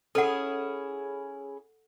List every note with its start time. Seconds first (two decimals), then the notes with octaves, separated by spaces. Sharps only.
0.15 C#4 E4 G#4 A4 F#5